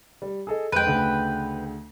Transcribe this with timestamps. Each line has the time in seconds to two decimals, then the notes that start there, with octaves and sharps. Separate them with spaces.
0.22 G3
0.47 G#4 A4 D#5
0.72 F2 G#3 B4 G5
0.86 D2 C#3